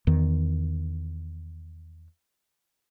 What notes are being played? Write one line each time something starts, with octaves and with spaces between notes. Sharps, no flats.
E2 D#3